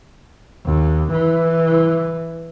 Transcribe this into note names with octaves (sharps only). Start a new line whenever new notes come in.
D#2
E3